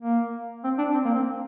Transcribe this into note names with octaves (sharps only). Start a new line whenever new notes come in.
A#3
C4
D4
C4
A#3
C4